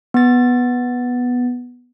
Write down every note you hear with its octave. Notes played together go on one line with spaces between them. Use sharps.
B3 A6